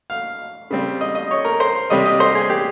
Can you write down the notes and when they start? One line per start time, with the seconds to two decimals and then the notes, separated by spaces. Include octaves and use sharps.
0.10 F5
0.71 C#3 G3 C4
1.01 D#5
1.15 D#5
1.31 C#5
1.45 A#4
1.60 C5
1.90 C3 G3 C#4 D#5
2.06 D#5
2.20 C5
2.35 G#4
2.50 G4